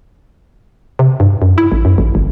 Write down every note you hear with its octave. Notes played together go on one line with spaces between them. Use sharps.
C3
G2
F#2
E4
A1
F#2
A1
G1